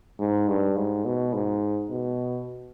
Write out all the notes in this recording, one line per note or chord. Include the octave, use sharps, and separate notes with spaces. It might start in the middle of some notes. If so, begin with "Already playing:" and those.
G#2
G2
G#2
B2
G#2
B2